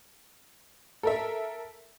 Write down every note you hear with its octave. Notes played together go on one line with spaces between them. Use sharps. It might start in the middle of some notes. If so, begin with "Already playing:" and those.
A4 A#4 E5